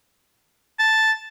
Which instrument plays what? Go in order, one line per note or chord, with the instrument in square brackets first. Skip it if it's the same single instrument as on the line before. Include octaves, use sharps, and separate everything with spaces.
[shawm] A5